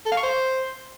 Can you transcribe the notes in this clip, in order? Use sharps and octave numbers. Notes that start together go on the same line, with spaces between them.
A4
F5
C#6
C5